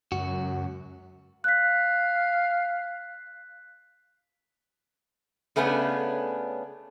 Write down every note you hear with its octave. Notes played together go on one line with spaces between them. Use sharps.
C#2 F#2 F#4
F5 F#6 B6
C#3 A3 B3 C#4 D4